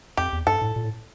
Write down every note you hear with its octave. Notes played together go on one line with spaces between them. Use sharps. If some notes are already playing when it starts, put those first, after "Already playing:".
F2 G4
E2
G2 A4
A2
A#2
A2